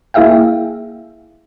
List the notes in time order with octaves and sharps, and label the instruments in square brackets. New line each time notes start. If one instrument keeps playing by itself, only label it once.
[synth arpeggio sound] A#3 E4 G#4 E5 F5 G5